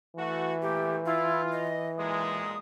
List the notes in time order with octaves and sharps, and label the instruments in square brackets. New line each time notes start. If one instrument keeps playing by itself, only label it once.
[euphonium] E3 [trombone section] A3 F#4
[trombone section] A#2 A3 [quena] G4
[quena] E4 [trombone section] F4
[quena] D#5
[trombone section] B1 A#2 G#3 [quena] D#6